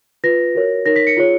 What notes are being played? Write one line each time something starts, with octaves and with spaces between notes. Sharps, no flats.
F4 B4 A#6
F#4 A#4 C#5
D#4 A#4 C#5 A#6
B6
C#7
F4 G#4 C#5